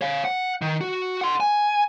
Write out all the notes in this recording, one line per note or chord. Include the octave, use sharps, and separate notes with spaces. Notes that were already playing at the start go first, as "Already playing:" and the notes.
C#5 F5
F#5
D#3
F#4
F#5 C6
G#5